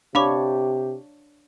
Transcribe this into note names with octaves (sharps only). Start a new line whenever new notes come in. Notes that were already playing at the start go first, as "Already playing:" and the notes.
C3 D4 G4 C#5 F5 B5 D6